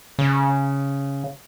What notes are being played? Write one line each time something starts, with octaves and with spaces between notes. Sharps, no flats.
C#3